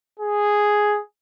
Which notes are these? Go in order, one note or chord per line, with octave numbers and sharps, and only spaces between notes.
G#4